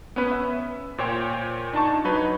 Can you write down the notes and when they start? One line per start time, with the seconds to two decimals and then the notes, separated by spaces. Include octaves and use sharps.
0.16 B3 C#4 B4
0.31 E5
0.98 A#2 C5 C#5 G5
1.73 D4 D#4 A5 C#6
2.05 F#3 D#4 B4 C#5